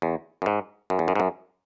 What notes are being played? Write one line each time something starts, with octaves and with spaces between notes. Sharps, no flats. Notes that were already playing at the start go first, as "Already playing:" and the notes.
E2
F#2
G#2
F#2
E2
F#2
G#2
F#2